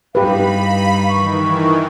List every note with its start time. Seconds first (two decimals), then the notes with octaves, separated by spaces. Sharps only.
0.15 G2 D#4 G4 B4 F5 B5
1.08 D#3 E3 C#6